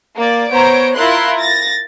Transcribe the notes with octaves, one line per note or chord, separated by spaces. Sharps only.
A#3 D5
B3 C5 C#5 A#5 D7
E4 F4 A#4 C6 F#6
A6 A#6